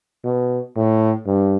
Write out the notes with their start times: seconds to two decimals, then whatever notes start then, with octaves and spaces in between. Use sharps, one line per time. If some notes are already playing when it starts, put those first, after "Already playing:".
0.24 B2
0.76 A2
1.26 G2